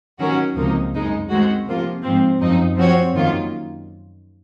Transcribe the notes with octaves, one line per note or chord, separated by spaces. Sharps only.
D#3 F#3 C#4 F#4 A#4
C#2 C3 F3 A#3 D#4
F#2 C#3 G#3 D#4
D#3 G#3 C4 F#4
C3 F3 A#3 F4
G#2 F3 C4
F#2 F3 C4 D#4
F3 C4 F#4 C#5
F#2 D#3 A#3 F4